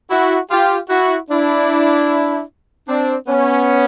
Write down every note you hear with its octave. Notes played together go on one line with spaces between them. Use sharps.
E4 F#4
F4 G4
E4 F#4
D4 E4
C4 D4
B3 C#4